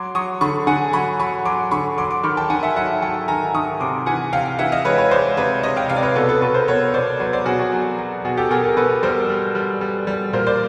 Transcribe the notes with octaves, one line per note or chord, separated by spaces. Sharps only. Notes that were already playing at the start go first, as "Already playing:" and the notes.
Already playing: F#3 C6 D6
F#3 C#6 D#6
D3 B5 C#6
D3 F#5 G#5
F#3 B5 C#6
F#3 B5 C#6
F#3 C6 D6
D3 B5 C#6
F#3 C6 D6
C6 D6
D#3 B5 C#6
G5 A5
D#3 F#5 G#5
E5 F#5
F#3 E5 F#5
F#3 G5 A5
D#3 G#5 A#5
D#3 C#6 D#6
C3 C6 D6
E3 F#5 G#5
C3 F5 G5
E3 E5 F#5
D#5 F5
G#3 B4 C#5
B4 C#5
G#3 C5 D5
C3 B4 C#5
C3 C#5 D#5
F5 G5
C3 F5 G5
D5
B4 C#5
B2 A4 B4
A4 B4
B2 A4 B4
A#4 C5
B2 B4 C#5
B2 C5 D5
F#3 B4 C#5
C5 D5
B2 F#4 G#4
F#4 G#4
F#3
F#3
B2 F#4 G#4
G4 A4
B2 G#4 A#4
G#4 A#4
B2 A4 B4
G3 A#4 C5
G3
G3
G3
G3
A#2 A#4 C5
C5 D5